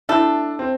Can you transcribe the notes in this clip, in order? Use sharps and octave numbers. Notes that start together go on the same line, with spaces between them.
A3 D4 E4 A4
C4